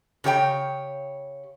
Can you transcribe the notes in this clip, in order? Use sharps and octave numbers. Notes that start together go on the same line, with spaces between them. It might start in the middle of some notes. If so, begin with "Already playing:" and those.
C#3 G4 C#5 G5